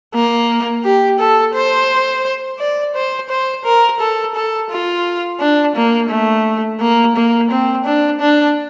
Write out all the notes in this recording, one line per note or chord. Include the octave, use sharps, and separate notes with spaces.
A#3
G4
A4
C5
D5
C5
C5
A#4
A4
A4
F4
D4
A#3
A3
A#3
A#3
C4
D4
D4